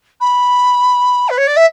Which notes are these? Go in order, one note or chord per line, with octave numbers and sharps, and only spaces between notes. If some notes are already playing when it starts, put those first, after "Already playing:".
B5
B4
C#5
D5
E5